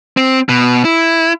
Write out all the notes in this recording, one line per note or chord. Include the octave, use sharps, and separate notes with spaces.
C4
B2
E4